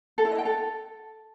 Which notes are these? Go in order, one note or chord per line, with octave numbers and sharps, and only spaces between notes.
A4
E4
D#5
G5
A4